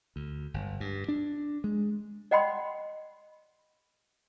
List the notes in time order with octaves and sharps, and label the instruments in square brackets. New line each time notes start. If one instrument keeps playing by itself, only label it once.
[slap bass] D2
G1
G2
D4
G#3
[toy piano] D5 D#5 F#5 G5 B5 C6